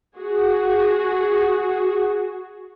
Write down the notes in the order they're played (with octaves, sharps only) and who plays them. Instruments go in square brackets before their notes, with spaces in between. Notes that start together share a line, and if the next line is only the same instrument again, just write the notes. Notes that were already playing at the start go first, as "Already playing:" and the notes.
[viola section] F#4 G#4